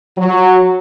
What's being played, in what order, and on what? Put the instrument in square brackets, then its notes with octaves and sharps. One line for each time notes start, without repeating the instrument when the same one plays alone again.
[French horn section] F#3